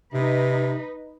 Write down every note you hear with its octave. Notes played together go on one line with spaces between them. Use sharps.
C3 D#4 B4